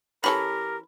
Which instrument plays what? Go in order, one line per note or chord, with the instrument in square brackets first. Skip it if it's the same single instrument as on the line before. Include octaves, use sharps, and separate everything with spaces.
[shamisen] E3 C#4 A4 [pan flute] G4 [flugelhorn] A#4 [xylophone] B5